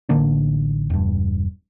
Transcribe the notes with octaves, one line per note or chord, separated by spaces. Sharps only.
A1 D3 A#3 D4
E1 G2